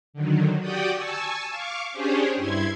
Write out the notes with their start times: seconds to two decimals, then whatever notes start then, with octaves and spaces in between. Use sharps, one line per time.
0.13 D3 D#3 F#3
0.60 F#4 G4 D5 F#5 G5 D#6
0.94 G#5 A5 C#6 E6
1.51 F5 C#6 D6
1.92 C#4 D4 G4 G#4 C5 C#5
2.36 G2 E4 C6 G#6